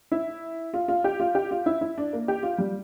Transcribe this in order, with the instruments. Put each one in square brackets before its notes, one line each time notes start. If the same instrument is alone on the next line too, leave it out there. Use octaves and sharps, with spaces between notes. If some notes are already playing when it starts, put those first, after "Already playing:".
[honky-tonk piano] E4
F4
F4
G4
F4
G4
F4
E4
E4
D4
A#3
G4
F4
G3